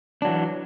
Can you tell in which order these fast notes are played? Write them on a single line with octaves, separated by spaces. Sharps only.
D4 F#3 E3